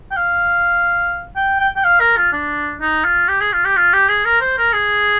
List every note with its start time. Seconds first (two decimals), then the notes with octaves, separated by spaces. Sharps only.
0.11 G5
0.17 F5
1.36 G5
1.60 G5
1.77 G5
1.85 F5
2.00 A#4
2.17 F4
2.33 D4
2.81 D#4
3.05 F4
3.28 G4
3.41 G#4
3.53 F4
3.65 G4
3.77 F4
3.93 G4
4.09 G#4
4.25 A#4
4.41 C5
4.58 A#4
4.73 G#4